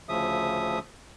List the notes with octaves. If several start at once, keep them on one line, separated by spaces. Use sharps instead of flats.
D2 C#3 F3 E5 D#6